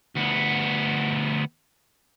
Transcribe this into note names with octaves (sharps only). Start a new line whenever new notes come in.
D2 B3